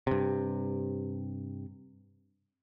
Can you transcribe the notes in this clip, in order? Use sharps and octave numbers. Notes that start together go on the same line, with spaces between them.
G2 C3